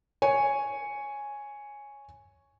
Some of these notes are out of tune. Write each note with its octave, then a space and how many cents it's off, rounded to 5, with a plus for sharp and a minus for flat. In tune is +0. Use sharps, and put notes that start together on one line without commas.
C#5 +0 G#5 +0